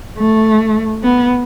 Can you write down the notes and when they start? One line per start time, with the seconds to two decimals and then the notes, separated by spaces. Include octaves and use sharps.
0.18 A3
1.03 B3